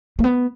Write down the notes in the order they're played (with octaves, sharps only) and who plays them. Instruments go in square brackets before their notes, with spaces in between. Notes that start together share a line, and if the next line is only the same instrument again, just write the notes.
[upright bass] A#3
B3